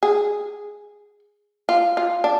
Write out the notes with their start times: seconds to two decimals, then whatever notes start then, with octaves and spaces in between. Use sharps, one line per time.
0.03 G#4
1.69 F4
1.97 F4
2.24 D4